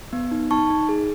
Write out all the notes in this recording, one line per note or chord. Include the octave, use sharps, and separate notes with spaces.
B3
D#4
D#4 A5 C#6
D#4
G#4